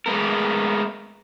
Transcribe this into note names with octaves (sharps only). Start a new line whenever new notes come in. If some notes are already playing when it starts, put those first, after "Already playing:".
G#3 A3 B3 A#4